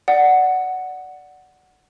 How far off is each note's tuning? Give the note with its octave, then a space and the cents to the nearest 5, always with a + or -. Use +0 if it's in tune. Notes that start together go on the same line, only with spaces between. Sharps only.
D5 +0 F#5 +0